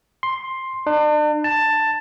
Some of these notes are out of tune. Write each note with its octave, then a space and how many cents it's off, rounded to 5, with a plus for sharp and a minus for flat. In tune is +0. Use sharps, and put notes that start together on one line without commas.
C6 +10
D4 +40
A5 +10